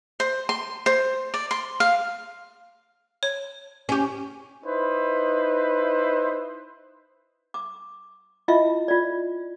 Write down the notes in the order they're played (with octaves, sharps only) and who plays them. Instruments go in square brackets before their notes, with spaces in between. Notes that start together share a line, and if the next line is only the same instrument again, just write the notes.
[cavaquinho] C5
C6
C5
D5
C6
F5
[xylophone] C#5
[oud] C#4 G4
[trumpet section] D#4 E4 B4 C5
[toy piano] D6
E4 F4 D#5 E5
F4 D5